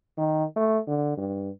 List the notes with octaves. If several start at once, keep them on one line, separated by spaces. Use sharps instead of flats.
D#3
A3
D3
G2